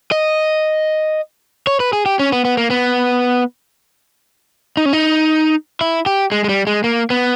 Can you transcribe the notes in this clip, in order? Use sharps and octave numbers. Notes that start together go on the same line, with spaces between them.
D#5
C#5
B4
G#4
G4
C#4
B3
B3
A#3
B3
D#4
C#4
D#4
E4
G4
G#3
G#3
G3
G#3
A#3
B3